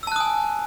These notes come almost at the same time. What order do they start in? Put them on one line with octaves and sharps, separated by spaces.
E6 A5 F#6 D#6 G#5